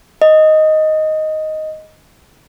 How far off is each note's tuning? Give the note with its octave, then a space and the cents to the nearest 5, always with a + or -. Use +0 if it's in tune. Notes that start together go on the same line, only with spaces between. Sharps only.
D#5 +5